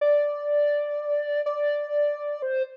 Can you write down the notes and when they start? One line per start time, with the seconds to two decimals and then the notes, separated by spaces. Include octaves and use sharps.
0.01 D5
1.46 D5
2.42 C5